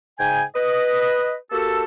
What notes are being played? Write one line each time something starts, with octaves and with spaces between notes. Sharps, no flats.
G#2 C#3 G5 G#5
B4 D#5
A#3 F#4 G4 A4